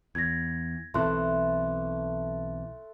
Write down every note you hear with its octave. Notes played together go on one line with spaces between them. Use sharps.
E2 G#6 A#6
B1 E3 A3 C4 C6 F#6